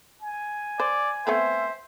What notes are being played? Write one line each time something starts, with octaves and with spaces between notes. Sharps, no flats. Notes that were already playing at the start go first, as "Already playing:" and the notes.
G#5
C5 D5
A3 B3 C4 C5 E5